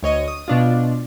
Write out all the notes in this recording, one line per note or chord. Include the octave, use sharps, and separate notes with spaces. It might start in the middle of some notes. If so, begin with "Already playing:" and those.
D2 C#5 D#5 D#7
D#6
B2 D4 F4